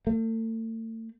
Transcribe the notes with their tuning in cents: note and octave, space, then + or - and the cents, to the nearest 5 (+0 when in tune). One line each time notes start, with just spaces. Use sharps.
A3 +40